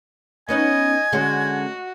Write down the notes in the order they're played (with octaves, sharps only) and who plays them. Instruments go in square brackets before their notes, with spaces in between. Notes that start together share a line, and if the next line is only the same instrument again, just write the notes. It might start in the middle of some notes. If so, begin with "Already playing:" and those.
[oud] B3 C#4 D#4 [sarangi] D#5 [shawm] G#5
[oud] D3 G#3 C#4 [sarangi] F#4